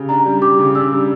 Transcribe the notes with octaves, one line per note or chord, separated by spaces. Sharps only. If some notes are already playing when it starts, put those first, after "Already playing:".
Already playing: C#3 G4
D4 A#5
G3
G4 D6
C#3
D4 E6
G3